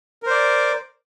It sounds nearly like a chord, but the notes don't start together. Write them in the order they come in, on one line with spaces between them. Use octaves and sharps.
A#4 C5 D5